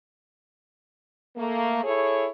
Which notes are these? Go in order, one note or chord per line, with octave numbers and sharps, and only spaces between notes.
A3 A#3
E4 G#4 A4 C#5